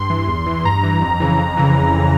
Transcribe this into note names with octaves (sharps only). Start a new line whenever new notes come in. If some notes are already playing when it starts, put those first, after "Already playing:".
Already playing: G2 C6
E3
E2
E3
G2 A#5
E3
F2
C#3 E3
F2
C#3 E3